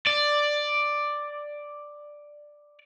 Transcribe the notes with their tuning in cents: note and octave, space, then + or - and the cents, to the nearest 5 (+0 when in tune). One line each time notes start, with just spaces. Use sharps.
D5 +5